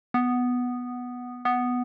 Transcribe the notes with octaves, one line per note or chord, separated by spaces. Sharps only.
B3
B3